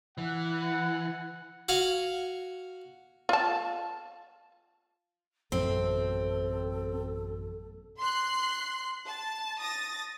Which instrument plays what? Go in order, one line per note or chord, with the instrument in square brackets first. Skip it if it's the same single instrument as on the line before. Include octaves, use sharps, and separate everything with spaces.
[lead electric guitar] E3 [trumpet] F#5
[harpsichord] F#4 F5 G#5
[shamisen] F4 A5
[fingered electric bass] A1 F#2 B2 [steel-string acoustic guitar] C4 [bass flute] A4
[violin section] C6 F#6 C7
A5
D#6 A6 A#6